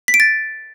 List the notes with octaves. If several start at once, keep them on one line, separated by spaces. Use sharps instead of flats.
B6
D7
A6